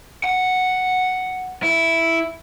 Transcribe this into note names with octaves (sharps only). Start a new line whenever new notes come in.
F#5
E4